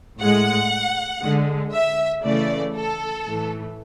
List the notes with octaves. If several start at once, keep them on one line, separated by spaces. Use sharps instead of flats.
A2 G#3 F#5
D3 G#3
E5
C#3 E3 A3 D5
A4
A2 E3 A3